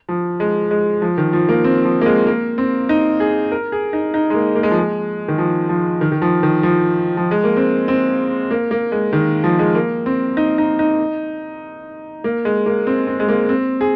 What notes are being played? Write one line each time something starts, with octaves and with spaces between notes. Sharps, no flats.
F3
G#3
G#3
F3
D#3
F3
A#3
C4
F3
A#3
G#3
A#3
C4
D#4
G#4
A#4
G#4
D#4
D#4
G#3
A#3
A#3
G#3
F3
G#3
D#3
F3
F3
D#3
D#3
F3
D#3
F3
F3
G#3
A#3
C4
C4
A#3
A#3
G#3
D#3
F3
G#3
A#3
C4
D#4
D#4
D#4
A#3
G#3
A#3
C4
C4
G#3
A#3
C4
G#4